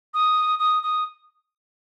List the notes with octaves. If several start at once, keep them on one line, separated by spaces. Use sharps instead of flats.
D#6
D#6
D#6